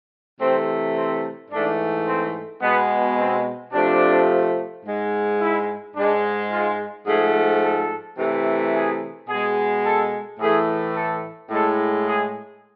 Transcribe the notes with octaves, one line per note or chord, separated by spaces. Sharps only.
C3 E3 A3 C4
C4
G#2 E3 A3 D4
C4
B2 G#3 B3
C4
C3 F3 A3 D4
G#2 G#3
E4
G#2 G#3 D4
F4
G#2 F3 A3 G#4
A4
C3 E3 A3
G#4
B2 G#3 G#4
A4
A2 E3 A3 G#4
A4
A2 G#3 A4
G#4